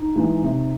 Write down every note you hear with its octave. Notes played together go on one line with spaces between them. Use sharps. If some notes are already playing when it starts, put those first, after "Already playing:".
Already playing: D#4
E3 G#3
C3